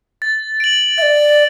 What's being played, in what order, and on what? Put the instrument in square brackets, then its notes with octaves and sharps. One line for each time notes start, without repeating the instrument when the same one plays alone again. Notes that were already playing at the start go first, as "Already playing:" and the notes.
[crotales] A6
D7 F#7
[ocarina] D5 E5 [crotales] A6